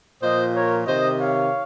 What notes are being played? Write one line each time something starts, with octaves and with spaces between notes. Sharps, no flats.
A#2 F3 C5 D#5
A#4 C#5
C3 D#3 C5 D#5
C#5 F5